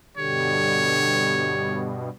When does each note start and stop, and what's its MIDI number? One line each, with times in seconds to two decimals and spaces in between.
0.17 2.09 43
0.17 2.09 47
0.17 1.98 50
0.17 1.98 67
0.17 1.88 73